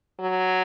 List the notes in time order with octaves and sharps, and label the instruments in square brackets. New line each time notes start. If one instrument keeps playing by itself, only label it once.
[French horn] F#3